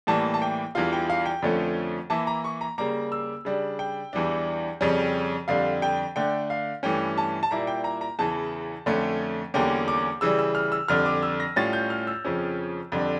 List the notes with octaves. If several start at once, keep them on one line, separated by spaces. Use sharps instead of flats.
A2 E3 G3 A#3 A5
A5
G5
E2 E3 G3 D4 F4 F5
G5
F5
G5
F2 D3 F3 A3 C#4
E3 A#3 E4 A5
A#5
C#6
A#5
C#3 G3 A#3 A#5
E6
C#3 G3 D4
G5
E2 E3 G3 D4
F2 C#3 G3 C#4
F2 D3 G3 F5
G5
D3 A3 D4 G5
F5
G2 E3 A3 C#4 G5
A5
A5
A#2 G3 A#3 E4 A#5
G5
A#5
A#5
E2 C#3 E3 A5
F2 D3 A3 C#4
E2 D3 G3 A#3 C#4 G5
D6
C#3 E3 G3 E6
E6
F6
E6
F2 D3 G3 F6
D6
E6
A#6
A2 G3 C#4 F4 A6
G6
F6
E6
F2 C#3 F3 C#4
F2 D3 G3 D4